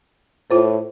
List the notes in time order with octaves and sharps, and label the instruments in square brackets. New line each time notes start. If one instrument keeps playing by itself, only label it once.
[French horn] A2 [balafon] F4 C5